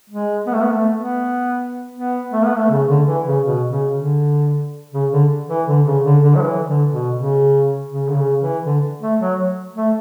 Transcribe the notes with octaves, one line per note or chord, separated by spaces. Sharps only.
G#3
B3
A3
B3
A3
B3
B3
A3
B3
A3
C#3
D3
E3
C#3
B2
C#3
D3
C#3
D3
E3
D3
C#3
D3
D3
F#3
E3
D3
B2
C#3
C#3
D3
C#3
E3
D3
A3
F#3
A3